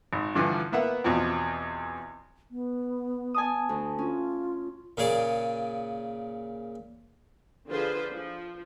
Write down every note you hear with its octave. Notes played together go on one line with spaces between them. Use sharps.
G#1
G2 D3 E3 F3
A#3 B3 E5 F#5
E2 B2 F3 C4
B3
G#5 A5 D#6
D2
C#4 F4
A#2 C#3 G#4 D5
D3 F3 F4 G#4 B4 C5
F3